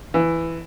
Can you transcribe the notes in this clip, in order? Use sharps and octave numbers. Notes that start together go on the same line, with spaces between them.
E3